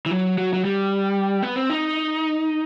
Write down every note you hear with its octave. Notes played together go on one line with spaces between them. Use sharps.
E3
F#3
F#3
F#3
G3
B3
C4
D#4